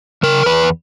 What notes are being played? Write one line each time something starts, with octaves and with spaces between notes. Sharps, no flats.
C#3 A#4
E2 B4